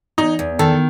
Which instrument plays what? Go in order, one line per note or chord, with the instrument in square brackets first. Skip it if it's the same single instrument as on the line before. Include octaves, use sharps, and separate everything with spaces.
[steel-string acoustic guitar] E2 [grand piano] D#4
[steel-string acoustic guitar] E2
[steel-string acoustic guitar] D#3 [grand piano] A4